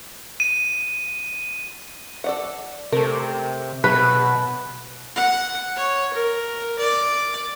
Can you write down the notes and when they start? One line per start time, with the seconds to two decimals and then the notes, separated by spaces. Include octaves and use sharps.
0.40 D#7
2.24 A4 D5 F#5
2.92 C3 A3 A#4
3.84 B2 F#3 B4
5.16 F#5
5.76 C#5
6.13 A#4
6.79 D5